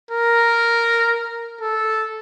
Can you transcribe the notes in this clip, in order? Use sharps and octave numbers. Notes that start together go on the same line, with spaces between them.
A#4
A4